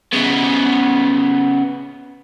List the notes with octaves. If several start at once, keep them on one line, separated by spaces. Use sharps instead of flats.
C#3 B3